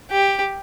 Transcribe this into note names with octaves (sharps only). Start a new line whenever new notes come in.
G4